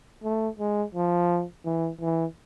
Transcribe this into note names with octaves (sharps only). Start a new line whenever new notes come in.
A3
G#3
F3
E3
E3